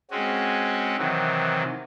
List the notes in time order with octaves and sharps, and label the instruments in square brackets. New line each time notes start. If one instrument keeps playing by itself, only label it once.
[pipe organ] G#3 C4 C#4 F#4
C3 D#3 E3 F#3